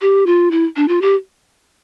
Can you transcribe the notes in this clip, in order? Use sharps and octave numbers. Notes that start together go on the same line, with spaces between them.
G4
F4
E4
D4
F4
G4